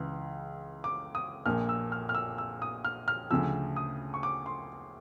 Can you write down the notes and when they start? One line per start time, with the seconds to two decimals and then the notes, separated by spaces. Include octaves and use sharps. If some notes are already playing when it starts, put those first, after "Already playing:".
Already playing: C#2 C#3 E3
0.84 D6
1.15 D#6
1.46 A#1 A#2 F3 F6
1.69 E6
1.92 F6
2.09 F6
2.15 E6
2.38 E6
2.62 D#6
2.85 F6
3.08 F6
3.30 D2 C#3 F3 E6
3.76 D#6
4.14 C#6
4.23 D6
4.46 C6